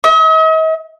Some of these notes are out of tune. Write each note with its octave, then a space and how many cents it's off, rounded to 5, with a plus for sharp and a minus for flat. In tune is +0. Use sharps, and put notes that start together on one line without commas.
D#5 +45